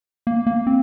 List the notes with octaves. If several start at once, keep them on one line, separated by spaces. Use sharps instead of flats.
A#3
A#3
C4